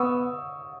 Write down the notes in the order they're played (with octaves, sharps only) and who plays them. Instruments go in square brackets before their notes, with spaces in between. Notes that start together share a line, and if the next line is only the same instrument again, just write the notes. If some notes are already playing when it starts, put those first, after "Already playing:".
Already playing: [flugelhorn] B3 [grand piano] C#6 D#6 E6